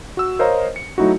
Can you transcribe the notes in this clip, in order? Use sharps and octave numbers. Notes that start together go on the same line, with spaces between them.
F#4 E6
A#4 C5 C#5 D#5 F5 A#5
C#7
F#3 A3 D#4 E4 F#4